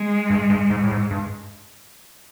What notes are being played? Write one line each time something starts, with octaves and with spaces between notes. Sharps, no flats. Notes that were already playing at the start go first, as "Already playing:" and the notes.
Already playing: G#3
G2
G2
G#2
A2
G#2
G2